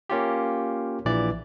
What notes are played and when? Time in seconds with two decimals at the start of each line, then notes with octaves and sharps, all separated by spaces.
0.10 A#3 C#4 F4 G4
1.05 A#1 A#2 E3 D5